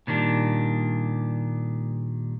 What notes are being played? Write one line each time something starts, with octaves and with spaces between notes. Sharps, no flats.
A#2 D#3 G3 D4